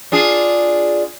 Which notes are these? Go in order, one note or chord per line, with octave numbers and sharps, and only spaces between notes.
D4 F4 G#4